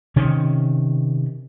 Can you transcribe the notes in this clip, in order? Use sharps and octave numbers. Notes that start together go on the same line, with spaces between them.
C3 D#3 C#4